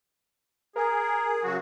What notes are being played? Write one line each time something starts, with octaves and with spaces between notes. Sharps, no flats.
G#4 A#4
C#3 F#3 F#4